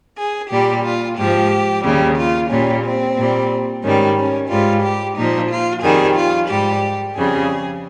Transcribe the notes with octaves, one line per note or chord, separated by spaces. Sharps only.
G#4
A#2 G3 G4
F4
G#2 F3 G4
D#2 C#3 G3
F4
A#2 G3 C#4
C4
A#2 G3
G#2 D#3 G3 C#4
C#4
G#2 G3 F4
G4
A#2 F3 D#4
F4
F2 D#3 G3 G#4
F4
G#2 G3 G4
F2 C#3 G3 G#4